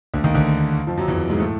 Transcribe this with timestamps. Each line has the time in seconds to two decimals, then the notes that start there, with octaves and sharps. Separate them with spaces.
0.14 D2 D3
0.24 D#2 D#3
0.35 D2 D3
0.87 F2 F3
0.98 F#2 F#3
1.08 E2 E3
1.30 G#2 G#3
1.40 A2 A3